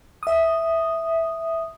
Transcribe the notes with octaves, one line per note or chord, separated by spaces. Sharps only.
E5 D#6